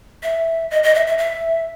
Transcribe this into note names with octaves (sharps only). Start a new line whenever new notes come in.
E5
D#5
D#5
E5
E5
E5